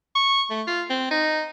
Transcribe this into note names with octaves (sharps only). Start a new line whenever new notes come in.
C#6
A3
F4
C4
D#4